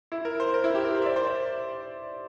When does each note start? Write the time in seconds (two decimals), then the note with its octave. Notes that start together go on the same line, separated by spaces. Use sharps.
0.12 E4
0.25 A#4
0.40 C5
0.54 A#4
0.64 E4
0.75 G4
0.85 A#4
0.95 C5
1.02 E5
1.06 D5
1.16 C5
1.27 D5